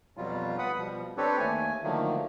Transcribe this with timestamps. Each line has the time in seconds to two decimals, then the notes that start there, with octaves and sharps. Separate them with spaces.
0.17 F2 B2 F#3 G3 F4
0.59 B4 F#5 B5 D#6
0.78 B2 F3 G3
1.17 C4 D4 G4 A4 B4 C#5
1.39 D#2 A3 G#5
1.83 D3 D#3 F3 F#3 A3 A#3